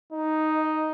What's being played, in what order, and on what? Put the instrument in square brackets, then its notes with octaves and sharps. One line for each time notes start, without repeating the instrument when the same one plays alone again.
[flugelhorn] D#4 [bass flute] D#5